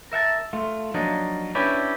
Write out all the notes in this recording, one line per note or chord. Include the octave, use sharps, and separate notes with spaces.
A#4 E5 F#5 A5
A3 F4
F3 F#3 A#3 D4 D#4
C#4 D4 E4 G4 B4 C#5